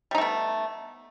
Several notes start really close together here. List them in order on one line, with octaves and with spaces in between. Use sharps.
G3 D#4 A3 B3